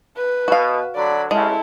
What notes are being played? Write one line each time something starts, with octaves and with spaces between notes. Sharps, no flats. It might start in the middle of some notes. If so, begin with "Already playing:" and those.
B4
B2 F#4 F5
D3 F#3 D5 B5
A1 C#3 G#3 E4 A4